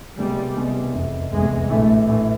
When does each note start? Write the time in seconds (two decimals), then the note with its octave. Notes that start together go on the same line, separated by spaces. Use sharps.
0.18 C2 B2 G3 G#3
0.57 C2 B2 G#3
0.95 F1 E2 C3
1.32 F1 E2 C3 G#3
1.70 A#1 A2 E3 A3
2.08 A#1 A2 E3